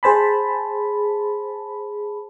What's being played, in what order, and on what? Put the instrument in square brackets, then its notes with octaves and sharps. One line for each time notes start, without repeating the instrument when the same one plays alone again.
[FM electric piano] G#4 C5 A5 B5